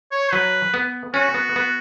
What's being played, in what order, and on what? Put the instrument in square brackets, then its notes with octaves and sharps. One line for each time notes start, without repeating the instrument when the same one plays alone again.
[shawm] C#5
[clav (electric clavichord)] F#3 [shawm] B4
[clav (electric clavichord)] B3
[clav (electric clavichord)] C#4 [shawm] F#4
[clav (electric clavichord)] B3
B3